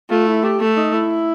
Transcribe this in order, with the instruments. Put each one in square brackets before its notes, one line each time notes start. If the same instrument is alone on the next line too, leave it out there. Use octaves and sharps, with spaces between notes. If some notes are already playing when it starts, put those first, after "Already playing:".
[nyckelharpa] A3 [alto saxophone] F4
[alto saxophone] E4
G4
[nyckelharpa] A3
[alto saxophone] D#4
E4